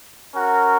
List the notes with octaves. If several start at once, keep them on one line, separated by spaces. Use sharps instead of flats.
C#4 F#4 A#4